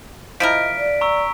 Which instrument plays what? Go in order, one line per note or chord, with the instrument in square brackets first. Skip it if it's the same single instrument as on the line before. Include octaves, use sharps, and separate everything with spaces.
[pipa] F3 E4 A#4 [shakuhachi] D#5 [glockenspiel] B6 D7
[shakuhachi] D5
[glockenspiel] A#5 C#6 E6